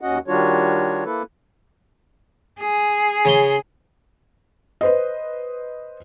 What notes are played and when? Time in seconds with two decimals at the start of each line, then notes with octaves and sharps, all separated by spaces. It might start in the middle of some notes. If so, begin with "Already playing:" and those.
0.01 D#2 C#4 F#4 D#5 F#5
0.28 D#3 G3 D4 F4 F#4 C#5
1.05 A#3 E4 A4 B4
2.60 G#4
3.25 C#3 C#5 C6
4.81 B4 C5 D#5